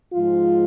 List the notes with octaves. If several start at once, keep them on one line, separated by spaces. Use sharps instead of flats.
G#2 F3 G#3 F4